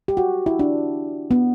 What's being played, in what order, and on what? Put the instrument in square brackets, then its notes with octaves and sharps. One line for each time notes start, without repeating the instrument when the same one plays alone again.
[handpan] G4
F#4
E4
D4
B3